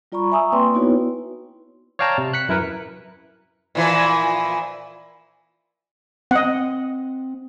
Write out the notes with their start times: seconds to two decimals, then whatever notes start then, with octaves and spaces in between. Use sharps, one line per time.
0.12 G3 F4 D5 A#5 B5 C#6
0.32 E5 G#5 A#5 C#6 D#6 E6
0.52 A#3 C4 B4 D5 G5 C6
0.74 B3 D#4 E4 F#4 B4 C#5
1.99 C#5 D5 F5 G5 A5 A#5
2.18 C3
2.33 F#6 B6 C#7
2.49 F#2 E4 A#4 B4
3.75 A#2 E3 F3
6.31 C4 D#5 F#5